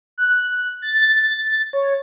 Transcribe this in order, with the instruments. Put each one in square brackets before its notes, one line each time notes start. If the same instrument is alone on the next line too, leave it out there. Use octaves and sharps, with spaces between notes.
[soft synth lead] F#6
A6
C#5